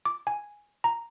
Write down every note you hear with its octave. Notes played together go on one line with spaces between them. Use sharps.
D6
G#5
A#5